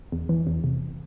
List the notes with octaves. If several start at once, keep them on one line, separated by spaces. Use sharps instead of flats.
E2
E3
E2
C3